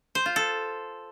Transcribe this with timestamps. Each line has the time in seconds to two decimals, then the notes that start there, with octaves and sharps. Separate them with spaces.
0.15 C5
0.26 F4
0.36 A4